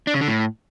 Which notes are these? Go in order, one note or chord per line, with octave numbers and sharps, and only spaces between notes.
D4
C#3
D3
A2